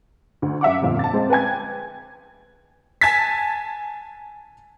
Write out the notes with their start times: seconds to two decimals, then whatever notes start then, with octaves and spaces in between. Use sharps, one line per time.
0.42 D2
0.61 F#2 E5 F#5 D6
0.82 G1 F2 A#2 F5
0.99 A5 A6
1.13 G#3 C4
1.30 B4 G5 G#5 G#6
3.01 G#5 A5 G#6 A6 B6